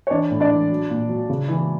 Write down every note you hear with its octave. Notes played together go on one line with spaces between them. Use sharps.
C#5
E3 D4 D5
A2
D4 D5
E3
F#3
A#2
F#3
C#3
E3